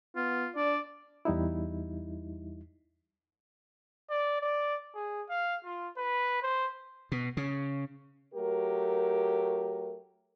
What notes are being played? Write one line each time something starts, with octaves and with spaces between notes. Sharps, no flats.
B3 F4
D4 D5
E2 G3 D#4 E4
D5
D5
G#4
F5
F4
B4
C5
B2
C#3
F#3 A3 G4 A#4